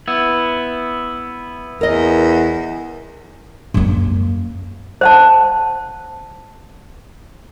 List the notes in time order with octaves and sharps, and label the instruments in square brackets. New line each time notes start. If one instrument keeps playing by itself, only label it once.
[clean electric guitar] B3 E4
[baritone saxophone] E2 [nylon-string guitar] A#4 D#5
[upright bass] F#2 A#3
[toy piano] C5 F#5 A5